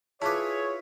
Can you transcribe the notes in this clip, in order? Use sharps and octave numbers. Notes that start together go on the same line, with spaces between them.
E4 F4 G#4 B4 C#5 A5 D6